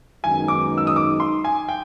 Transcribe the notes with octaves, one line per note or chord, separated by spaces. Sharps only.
F#2 D#3 G#3 B3 D#4 G#5
D6
E6
D#6
D6
C6
G#5
G5